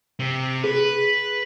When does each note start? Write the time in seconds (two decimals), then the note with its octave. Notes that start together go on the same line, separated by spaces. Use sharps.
0.19 C3
0.64 G#4 B4